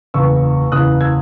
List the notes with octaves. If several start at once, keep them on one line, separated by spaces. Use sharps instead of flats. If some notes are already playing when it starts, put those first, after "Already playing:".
F#1 E2 C#3 E3 C#6 E6
F#1 E2 C#3 E3 D#6 F#6
E6 G#6